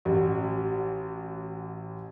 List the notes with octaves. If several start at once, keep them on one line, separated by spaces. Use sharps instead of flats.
A1 F#4